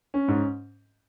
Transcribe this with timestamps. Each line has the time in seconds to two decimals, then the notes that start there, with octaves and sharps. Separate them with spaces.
0.14 C#4
0.28 G#2